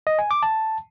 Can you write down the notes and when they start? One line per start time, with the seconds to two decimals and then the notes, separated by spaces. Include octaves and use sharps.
0.07 D#5
0.19 G#5
0.31 D6
0.43 A5